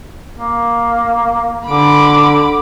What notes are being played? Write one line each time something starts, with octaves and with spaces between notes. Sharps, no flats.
A#3
D3 B5 D6